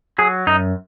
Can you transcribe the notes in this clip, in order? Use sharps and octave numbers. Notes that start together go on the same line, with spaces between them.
F#3 G#4
F#2 D#4